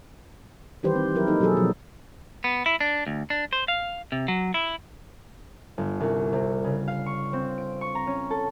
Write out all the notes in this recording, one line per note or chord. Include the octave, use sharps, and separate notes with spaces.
D#3 E3 G3 G4 B4 C5
C4
F#3 E4 A#4
A#3 D#4 A4
B2 F#3 A#3 G#4 A4
B2 F3 F#3
B3
E4
D4
D2
D4
C5
F5
C3
F#3
E4
G1
C2
C3
C#3
F5
C#6
C4
D7
C#6
A#5
C#4
A4